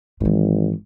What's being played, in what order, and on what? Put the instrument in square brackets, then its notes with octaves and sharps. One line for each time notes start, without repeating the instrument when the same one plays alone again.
[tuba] G#1 [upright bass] G#2 E3